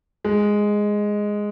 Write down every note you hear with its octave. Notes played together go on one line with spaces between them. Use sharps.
G#3